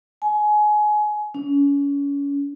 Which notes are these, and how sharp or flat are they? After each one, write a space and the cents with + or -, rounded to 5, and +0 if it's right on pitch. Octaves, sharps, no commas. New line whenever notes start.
G#5 +25
C#4 +30